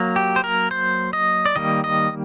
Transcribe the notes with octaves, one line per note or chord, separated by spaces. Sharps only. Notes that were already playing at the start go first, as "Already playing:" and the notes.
Already playing: F#3 A#3
G4
C5
A#4
C5
D#5
D5
D#3 G3 A#3 D#5
D#5